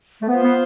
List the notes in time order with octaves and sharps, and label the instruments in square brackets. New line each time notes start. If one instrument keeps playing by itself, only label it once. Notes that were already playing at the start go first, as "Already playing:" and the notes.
[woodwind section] A3
[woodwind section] B3 [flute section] F4 C5 F5
[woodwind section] B3